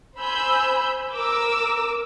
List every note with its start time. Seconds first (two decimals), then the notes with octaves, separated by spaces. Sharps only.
0.19 C5 G#5 B5 E6 G6
1.14 A#4 D6 E6